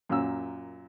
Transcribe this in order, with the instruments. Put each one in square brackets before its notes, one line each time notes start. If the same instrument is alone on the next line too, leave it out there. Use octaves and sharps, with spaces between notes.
[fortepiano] F#2 A#2 E6